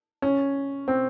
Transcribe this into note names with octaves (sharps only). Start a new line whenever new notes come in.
C#4
C4